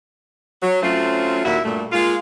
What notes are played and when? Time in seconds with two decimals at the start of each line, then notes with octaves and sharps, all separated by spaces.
0.62 F#3
0.82 F#3 A3 C4 C#4 F4
1.45 D#2 A#2 E4 F#4 E5
1.64 G2 A#2 A3
1.92 G#3 A#3 F4